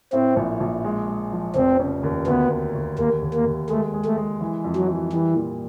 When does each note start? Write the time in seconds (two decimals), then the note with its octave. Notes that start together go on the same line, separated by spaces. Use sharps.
0.13 A2 C4
0.36 A#1
0.60 A#1
0.84 G#3
1.08 G#3
1.32 F3
1.55 F1 C4
1.80 C#3
2.03 D#2
2.27 D2 B3
2.51 A#3
2.74 D2
2.98 D#2 A#3
3.22 D#2
3.34 A#3
3.46 D#2
3.69 G#3 A3
3.94 G#3
4.05 A3
4.17 G#3
4.41 E3
4.64 F2
4.76 F#3
4.88 E3
5.12 E3 G3
5.36 A#2